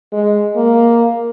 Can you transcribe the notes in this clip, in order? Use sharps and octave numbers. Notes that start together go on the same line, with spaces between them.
G#3
A#3